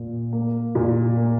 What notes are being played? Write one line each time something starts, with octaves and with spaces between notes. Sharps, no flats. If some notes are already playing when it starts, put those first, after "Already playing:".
Already playing: A#2
A#3
A#2
A#3